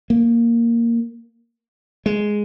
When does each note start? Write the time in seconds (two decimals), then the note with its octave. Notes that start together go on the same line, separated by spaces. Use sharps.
0.10 A#3
2.06 G#3